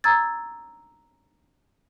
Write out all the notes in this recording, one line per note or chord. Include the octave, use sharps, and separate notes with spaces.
A#5 D#6 E6 G#6 A6